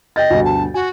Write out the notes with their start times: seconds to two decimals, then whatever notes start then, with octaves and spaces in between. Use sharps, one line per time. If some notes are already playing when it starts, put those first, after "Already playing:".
0.16 D#5 G5 G6 A6
0.30 D2 G2 B2
0.44 A5
0.74 F#4 G#5